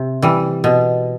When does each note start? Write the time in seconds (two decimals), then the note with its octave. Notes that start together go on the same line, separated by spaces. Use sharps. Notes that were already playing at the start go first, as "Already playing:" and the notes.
Already playing: C3
0.22 E3 G3
0.64 B2